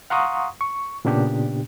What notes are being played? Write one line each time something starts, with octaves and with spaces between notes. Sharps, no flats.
F5 F#5 A#5 C6 C#6 D#6
C#6
A#2 C#3 B3 D4 G4